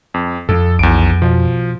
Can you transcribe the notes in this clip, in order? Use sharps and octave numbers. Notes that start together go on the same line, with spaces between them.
F2
F2 A4
B1 E2 D7
B2 F3